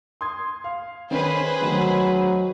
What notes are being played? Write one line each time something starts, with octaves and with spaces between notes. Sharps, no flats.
C6 D#6 G#6
F5
D#3 C#4 G#4 B4 C5
D2 D#3 F#3